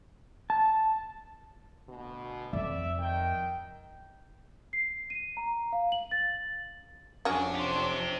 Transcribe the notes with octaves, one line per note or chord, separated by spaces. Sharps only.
A5
D2 B2
F2 D5 E5
D#3 G5
C7
D#7
A#5
F5
F#7
A6
F2 C#4 D4 F#4 G#4 C#5
G4 C5